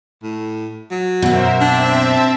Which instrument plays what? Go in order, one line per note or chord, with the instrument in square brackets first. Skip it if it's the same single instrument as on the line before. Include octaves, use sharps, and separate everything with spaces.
[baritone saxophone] A2
F#3
[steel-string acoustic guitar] F#2 B2 [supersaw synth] A#4 C5 E5 [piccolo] F#5
[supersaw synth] C4 E5 [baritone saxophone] D4
[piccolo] A5